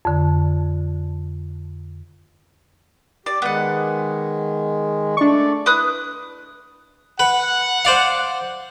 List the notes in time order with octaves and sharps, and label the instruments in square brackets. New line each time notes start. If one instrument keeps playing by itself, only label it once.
[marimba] F2 D3
[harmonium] G4 [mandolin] D5
[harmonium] D#3 G#3 [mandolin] B3 F#5
[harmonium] A3 D5 [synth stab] D4 C#6
[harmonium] E4 [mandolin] B4 D#6 F#6
[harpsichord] B4 [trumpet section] F#5
[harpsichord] C5 D5 F5